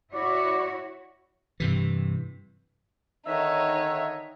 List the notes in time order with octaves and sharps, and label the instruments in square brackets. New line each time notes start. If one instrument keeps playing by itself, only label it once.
[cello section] E4 F#4 C#5 [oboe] D5
[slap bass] G2 C3 E3
[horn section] D3 D#3 E5 [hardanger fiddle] D#4 C#5